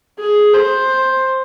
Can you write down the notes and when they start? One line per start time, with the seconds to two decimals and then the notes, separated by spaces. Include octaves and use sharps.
0.19 G#4
0.53 C5